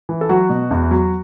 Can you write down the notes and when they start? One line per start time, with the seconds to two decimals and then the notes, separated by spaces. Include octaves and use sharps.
0.09 E3
0.21 A4
0.29 F#3 F#4
0.49 B2
0.71 E2
0.91 F#3